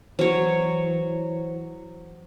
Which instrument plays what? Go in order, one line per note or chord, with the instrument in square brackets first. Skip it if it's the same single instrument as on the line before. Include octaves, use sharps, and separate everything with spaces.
[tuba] E3 [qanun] F#3 C#5 [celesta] C5